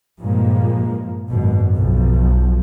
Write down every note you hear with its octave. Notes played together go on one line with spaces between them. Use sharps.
G2 A#2 F3 G#3 A#3
G#1 F#2 B2
B1 F3